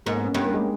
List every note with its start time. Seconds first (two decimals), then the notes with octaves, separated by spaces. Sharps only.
0.06 G#2 A#3
0.16 B3
0.25 C#4
0.34 G2 B3
0.45 A#3
0.54 G#3